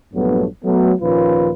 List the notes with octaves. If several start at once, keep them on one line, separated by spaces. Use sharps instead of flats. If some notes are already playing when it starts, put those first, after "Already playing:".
A#1 G2 F#3 A3 B3
F#3 A3 B3
D#2 A#2 F3 C#4 F4 B4